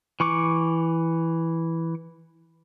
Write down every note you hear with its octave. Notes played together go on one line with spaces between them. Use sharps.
E3 C#6 D6